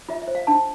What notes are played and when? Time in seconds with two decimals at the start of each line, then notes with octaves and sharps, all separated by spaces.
0.09 F4 E5
0.22 E5
0.28 C5
0.35 F5
0.47 D4 A5